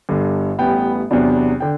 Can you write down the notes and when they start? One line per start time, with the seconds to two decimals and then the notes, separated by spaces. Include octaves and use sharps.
0.09 G1 G2 D3
0.59 A1 A2 G3 B3 G5
1.11 E2 C3 F#3 B3 D4
1.60 D3 G5